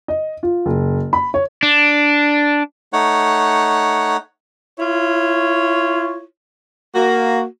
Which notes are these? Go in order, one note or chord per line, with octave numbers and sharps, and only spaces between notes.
D#5
F4
F#1
B5
C#5
D4
A3 D#4 C#5 F#5
E4 F4 C#5
A#3 F#4